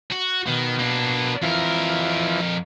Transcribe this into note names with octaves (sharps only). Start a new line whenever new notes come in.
F#4
B2 D#3
A#3 D4
F2 E3 F3 A#4